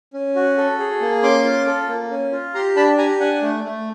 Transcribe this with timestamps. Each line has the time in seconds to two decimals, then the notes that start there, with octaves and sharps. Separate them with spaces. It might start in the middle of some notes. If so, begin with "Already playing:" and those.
0.13 C#4
0.36 F#4
0.58 A4
0.79 G#4
1.01 A#3
1.23 C#4 C6 D6
1.44 F4
1.67 A4
1.89 A#3
2.10 C#4
2.32 F4
2.54 G4 A#5 C6
2.76 D4 A5 B5
2.98 G4 G#5 A#5
3.20 D4 F#5 G#5
3.42 A3
3.64 A3